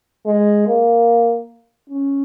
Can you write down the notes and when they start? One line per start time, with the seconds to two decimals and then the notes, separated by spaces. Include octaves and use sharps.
0.26 G#3
0.67 A#3
1.90 C#4